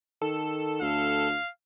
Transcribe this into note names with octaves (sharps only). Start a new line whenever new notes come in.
D#3 A4
D2 F5